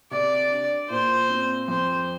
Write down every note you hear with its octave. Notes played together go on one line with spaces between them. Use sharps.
C3 D5
D4
A#2 C5
C4
F2 C5